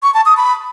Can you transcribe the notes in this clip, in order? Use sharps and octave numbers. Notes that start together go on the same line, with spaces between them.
C#6
A5
D#6
B5